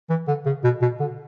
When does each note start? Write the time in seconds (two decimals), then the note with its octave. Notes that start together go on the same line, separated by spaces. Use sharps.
0.10 E3
0.28 D3
0.46 C#3
0.64 B2
0.82 B2
1.00 D3